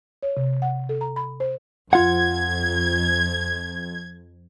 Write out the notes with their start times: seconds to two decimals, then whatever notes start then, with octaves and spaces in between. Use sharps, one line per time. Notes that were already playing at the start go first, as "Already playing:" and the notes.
0.23 C#5
0.37 C3
0.62 F#5
0.89 A4
1.01 A#5
1.16 B5
1.40 C5
1.93 F2 F4 F5 F#5 G#6